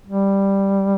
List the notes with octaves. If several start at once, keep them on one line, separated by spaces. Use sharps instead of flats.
G3